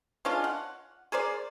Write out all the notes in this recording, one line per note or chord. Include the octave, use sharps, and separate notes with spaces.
G#3 C#4 D4 F4
F#5
G#4 A#4 C5 D5